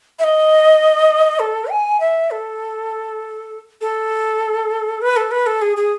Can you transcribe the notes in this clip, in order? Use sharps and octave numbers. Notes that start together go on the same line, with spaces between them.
E5
D#5
A4
G#5
E5
A4
A4
B4
A4
B4
A4
G#4
G#4